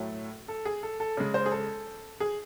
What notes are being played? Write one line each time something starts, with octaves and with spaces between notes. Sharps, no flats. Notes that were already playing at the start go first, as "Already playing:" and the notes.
Already playing: A2 F#3 A3
A4
G#4
A4
A4
C#3 G#3
C5
G#4
A4
G#4